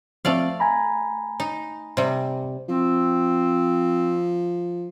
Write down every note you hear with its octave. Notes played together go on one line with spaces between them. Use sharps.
F3 A3 C4 D5 F5
G#5 A#5 B5
D#4
C3 G3
F3 C4